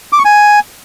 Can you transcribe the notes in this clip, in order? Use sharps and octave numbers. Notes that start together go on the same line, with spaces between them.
D6
C#6
G#5